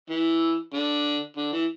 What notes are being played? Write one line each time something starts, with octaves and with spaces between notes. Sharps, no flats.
E3
D3
D3
E3